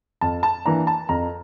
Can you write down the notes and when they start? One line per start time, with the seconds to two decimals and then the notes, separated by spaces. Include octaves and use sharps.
0.21 F2 A5
0.43 A5
0.65 E3 A#3 D4 A#5
0.87 A5
1.09 F2 A#5